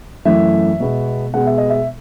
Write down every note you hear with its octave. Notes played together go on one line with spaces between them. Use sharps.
F#2 E3 A3 E5
B2 G#3 B3
B2 G#3 B3 F#5
E5
D#5
E5